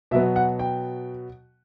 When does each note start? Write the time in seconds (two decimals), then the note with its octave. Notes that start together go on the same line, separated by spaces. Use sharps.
0.11 B2 F#3 B3 E5
0.36 F#5
0.59 G5